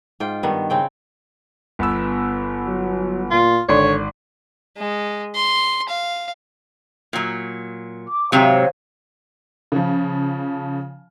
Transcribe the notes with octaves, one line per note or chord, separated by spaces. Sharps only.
G#2 F4 G5
G2 D#3 B3
C#3 C4 G5
G1 B3 E6
F#3
A#2 F4
G#1 D3 C#5 D5 C6
G#3
C6
F5
A#2 F#3
D6
G#2 C3 F#3 C5 C#5 F5
C#3 F3